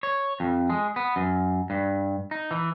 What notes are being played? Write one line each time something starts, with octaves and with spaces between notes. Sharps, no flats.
C#5
F2
G#3
B3
F#2
G2
D#4
E3